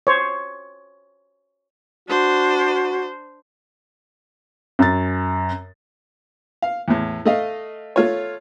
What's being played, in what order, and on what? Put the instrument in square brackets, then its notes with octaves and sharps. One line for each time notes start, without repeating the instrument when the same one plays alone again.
[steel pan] C5 C#5
[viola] D4 C5 [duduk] F#4
[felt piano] F#2 A6
[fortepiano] F5
E2 A2
A3 D#5 F5
A3 F4 C#5